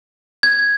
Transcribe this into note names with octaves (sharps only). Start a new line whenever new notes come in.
G#6